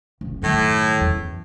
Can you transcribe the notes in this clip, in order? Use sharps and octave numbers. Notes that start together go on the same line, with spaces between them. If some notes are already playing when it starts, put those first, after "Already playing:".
F#1 C#2
F#2 A2 D#3
F#1 E2